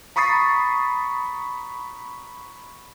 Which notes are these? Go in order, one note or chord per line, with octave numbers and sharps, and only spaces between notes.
A#5 B5 C#6 D#6 A6 C7